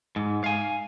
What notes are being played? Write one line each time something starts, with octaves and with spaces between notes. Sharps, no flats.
G#2
F5 G#5